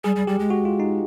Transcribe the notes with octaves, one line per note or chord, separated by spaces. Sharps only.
G3 G#4
G3
G3 G4
G#3
F#4
F4
D#4